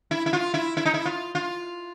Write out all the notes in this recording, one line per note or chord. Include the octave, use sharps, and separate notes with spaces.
E4
E4
F4
E4
E4
D#4
E4
F4
F4